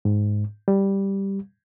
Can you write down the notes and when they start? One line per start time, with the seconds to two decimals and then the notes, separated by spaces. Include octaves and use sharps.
0.05 G#2
0.68 G3